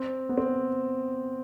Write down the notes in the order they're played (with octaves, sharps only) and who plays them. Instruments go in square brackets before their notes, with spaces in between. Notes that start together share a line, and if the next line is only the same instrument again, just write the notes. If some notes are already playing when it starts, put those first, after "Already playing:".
Already playing: [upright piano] C4
B3
C4